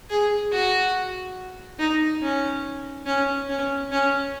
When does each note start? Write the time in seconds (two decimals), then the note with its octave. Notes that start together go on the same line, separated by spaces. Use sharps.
0.10 G#4
0.52 F#4
1.79 D#4
2.22 C#4
3.06 C#4
3.49 C#4
3.92 C#4